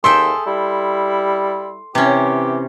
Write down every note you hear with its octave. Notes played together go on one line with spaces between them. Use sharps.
D#2 G#4 A4 E5 G5 C6
G3 E4
C3 E3 C#4 G4